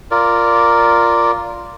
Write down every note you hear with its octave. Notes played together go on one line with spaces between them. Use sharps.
F4 A#4 D5